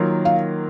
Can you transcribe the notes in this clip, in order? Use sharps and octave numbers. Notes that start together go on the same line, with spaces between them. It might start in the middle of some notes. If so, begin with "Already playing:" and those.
Already playing: D#3 F#3 A#3 F4
F5